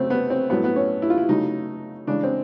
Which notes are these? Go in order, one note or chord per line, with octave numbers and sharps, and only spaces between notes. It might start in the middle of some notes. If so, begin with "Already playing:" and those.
Already playing: C#3 F#3 A3 C4
B3
C4
A2 F#3 A3 B3
B3
C#4
E4
F4
E4
C#3 F#3 A3 D#4
C#3 E3 G#3 D4
C4